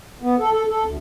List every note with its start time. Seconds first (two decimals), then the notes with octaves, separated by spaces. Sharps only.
0.22 B3
0.39 A4
0.52 A4
0.69 A4
0.84 D2